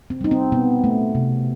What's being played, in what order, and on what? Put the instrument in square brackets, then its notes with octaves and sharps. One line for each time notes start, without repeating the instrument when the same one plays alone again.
[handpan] C4
G3 D#4
C4
B2 B3
A3
C3